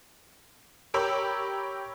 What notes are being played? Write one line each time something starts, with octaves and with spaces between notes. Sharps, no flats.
G4 A#4 C#5 G5 B5 E6